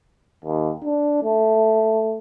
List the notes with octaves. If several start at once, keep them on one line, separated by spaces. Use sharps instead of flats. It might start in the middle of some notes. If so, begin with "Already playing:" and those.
D#2
D4
A3